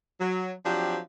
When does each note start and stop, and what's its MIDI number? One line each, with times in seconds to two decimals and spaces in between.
0.20 0.51 54
0.65 0.98 53
0.65 0.98 54
0.65 0.98 60
0.65 0.98 62
0.65 0.98 67